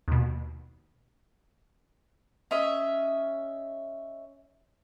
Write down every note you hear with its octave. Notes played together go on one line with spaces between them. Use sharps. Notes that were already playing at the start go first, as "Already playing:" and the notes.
D#2 B2
C#4 D#5 E5